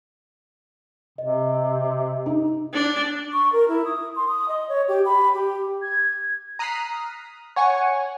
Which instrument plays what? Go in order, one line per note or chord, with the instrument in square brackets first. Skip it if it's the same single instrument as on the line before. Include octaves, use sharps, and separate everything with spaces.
[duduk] C3 [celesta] D#5
[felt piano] D#4
[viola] D4
[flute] C#6
A#4
E4
D#6
C6
D#6
D#5
C#5
G4
B5
G4
[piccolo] G#6
[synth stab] A#5 D#6 F6 F#6 B6 C7
C#5 F#5 G#5 C#6